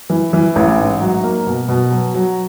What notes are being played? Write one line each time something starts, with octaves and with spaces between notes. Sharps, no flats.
E3
E3
A1
G#2
F#3
A#3
B2
B2
F#3
F#3